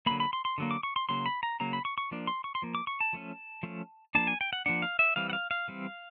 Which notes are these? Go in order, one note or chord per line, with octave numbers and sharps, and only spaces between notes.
D3 F#3 A#3 B5
B5
C6
C6
D3 F#3 A#3
D6
C#6
C6
C#3 F#3 A#3 C6
B5
A#5
C#3 F#3 A#3 A#5
B5
C#6
C#6
F3 A#3 D4
C6
C#6
C6
F3 A#3
D6
C#6
A5
F3 A3 C#4
F3 A3 C#4
F3 A#3 D4 A5
G#5
G5
F#5
F3 A#3 D4 F#5
F5
E5
E3 G3 C4 F5
F#5
F5
F5
E3 G3 C4